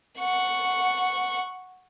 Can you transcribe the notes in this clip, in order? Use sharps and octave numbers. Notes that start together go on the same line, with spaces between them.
F#5 C#6